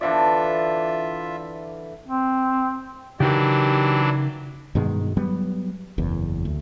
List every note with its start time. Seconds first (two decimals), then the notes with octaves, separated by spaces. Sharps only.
0.01 D3 E3 F4 D5 E5
2.08 C4
3.20 C#3 E3 F#3 D4 D#4 G4 A#4
4.75 G2 B2 D#3 G#3
5.17 F#3 G3 B3
5.98 F#1 E2
6.45 D2